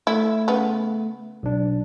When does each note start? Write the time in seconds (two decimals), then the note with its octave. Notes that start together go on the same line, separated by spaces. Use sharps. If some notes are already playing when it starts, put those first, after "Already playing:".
0.07 A3 E4
0.48 C#3 B3
1.43 B1 D4